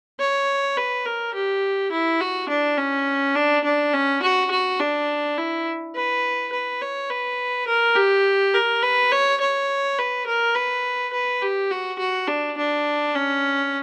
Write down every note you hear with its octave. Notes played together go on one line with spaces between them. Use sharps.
C#5
B4
A#4
G4
E4
F#4
D4
C#4
D4
D4
C#4
F#4
F#4
D4
E4
B4
B4
C#5
B4
A#4
G4
A#4
B4
C#5
C#5
B4
A#4
B4
B4
G4
F#4
F#4
D4
D4
C#4